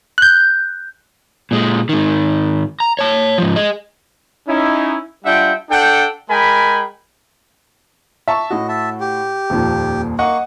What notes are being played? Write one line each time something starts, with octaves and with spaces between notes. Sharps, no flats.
F#6 G6
A#2 G#3
G#2 D#3
A#5
C#5 A5
G#2 F3
G#4 D#5
C#4 D#4 E4
G3 D4 F4 E5 F#5 G5
D4 A4 F#5 G5
G#3 A#4 G5 G#5 B5
E5 A5 C#6
A2 F#4 D#5
E5 A5
G4
D#1 F2 A#2
A#3 D#5 F#5 C#6